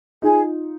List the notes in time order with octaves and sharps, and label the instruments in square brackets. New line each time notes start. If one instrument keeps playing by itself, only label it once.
[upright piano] D#4 F4 [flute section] G#4